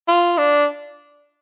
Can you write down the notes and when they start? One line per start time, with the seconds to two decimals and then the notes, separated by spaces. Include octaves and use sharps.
0.08 F4
0.38 D4